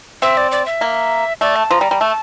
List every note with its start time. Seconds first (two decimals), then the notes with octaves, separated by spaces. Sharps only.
0.22 C4 E5
0.37 D5
0.52 D5
0.66 E5
0.81 A#3
1.41 A3 D5
1.56 A5
1.71 F3 A#5
1.81 G3
1.91 G3
2.00 A3 A5